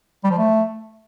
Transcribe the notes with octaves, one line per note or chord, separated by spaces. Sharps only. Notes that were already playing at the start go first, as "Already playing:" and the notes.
G3
F3
A3